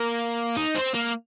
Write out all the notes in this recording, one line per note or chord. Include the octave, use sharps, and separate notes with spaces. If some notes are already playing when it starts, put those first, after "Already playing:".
Already playing: A#3
D#4
C4
A#3